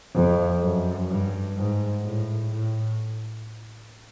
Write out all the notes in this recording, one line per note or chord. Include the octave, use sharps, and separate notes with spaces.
F2
F#2
G2
G#2
A2
A2